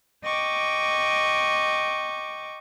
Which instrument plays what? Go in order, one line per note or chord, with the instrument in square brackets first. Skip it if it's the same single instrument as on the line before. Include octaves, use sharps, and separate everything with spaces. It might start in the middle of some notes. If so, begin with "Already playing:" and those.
[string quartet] D#5 G5 C#6 D6